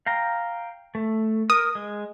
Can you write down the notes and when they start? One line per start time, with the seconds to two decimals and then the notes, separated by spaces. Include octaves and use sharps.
0.06 F5 G5 A#5
0.95 A3
1.50 A#4 D#6
1.75 G#3